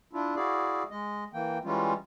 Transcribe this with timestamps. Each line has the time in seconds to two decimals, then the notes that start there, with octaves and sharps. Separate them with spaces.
0.13 D4 E4 F4
0.36 E4 F#4 G#4 D5 F5
0.91 G#3 D#5
1.34 E3 A#3 G5
1.65 E3 G3 G#3 C#4 F4